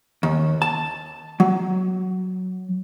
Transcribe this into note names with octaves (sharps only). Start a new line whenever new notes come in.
D#2
A5
F#3